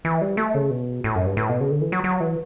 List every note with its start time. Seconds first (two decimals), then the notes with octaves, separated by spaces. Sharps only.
0.05 E3
0.21 G3
0.37 A3
0.55 C#3
0.71 B2
1.04 A2
1.15 F#2
1.26 G2
1.37 A2
1.49 B2
1.60 C#3
1.71 D3
1.81 E3
1.92 F#3
2.04 F#3
2.20 E3